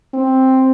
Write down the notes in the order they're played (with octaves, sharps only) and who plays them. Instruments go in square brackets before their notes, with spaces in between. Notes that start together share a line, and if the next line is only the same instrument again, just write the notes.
[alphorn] C4